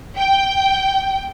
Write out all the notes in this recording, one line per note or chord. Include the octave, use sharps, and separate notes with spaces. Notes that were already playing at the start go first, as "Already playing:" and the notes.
G5